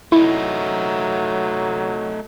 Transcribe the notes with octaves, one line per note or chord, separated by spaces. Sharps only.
F#3 A3 D#4 E4